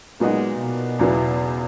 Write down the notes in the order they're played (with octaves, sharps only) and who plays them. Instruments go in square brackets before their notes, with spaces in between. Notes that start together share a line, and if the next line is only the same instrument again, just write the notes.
[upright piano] A#2 F#3 B3 D#4 F#4 [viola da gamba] G#3
[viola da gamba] B2
[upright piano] E2 C#3 F#3 B3 E4